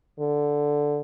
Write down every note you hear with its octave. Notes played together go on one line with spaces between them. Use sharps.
D3